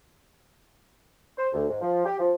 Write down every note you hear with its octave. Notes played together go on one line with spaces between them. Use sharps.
C5
D2
G#2
F3
G4
F3